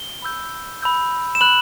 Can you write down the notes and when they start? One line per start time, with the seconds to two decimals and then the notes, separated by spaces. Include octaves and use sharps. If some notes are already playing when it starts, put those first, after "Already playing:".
Already playing: G7
0.22 B5 E6 G6
0.82 B5 E6 G6
1.35 E7
1.41 B5 F#6 F#7